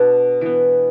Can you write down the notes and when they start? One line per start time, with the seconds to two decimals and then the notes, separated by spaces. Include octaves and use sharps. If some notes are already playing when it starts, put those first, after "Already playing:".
Already playing: B2 B3 D4
0.41 E3 B3